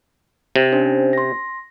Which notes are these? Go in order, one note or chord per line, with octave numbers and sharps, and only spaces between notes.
C3
C#4 D4 C5
C6 A#6